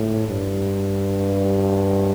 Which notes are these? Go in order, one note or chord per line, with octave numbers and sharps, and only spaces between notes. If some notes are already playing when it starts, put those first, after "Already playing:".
Already playing: A2
G2